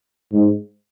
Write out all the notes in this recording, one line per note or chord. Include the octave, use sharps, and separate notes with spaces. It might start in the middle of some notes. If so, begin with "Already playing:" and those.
G#2